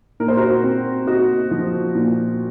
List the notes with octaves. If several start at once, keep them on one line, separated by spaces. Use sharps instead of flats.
A#2 A#4
C5
F#4 A#4
C4
D#4 F#4
F3
A#2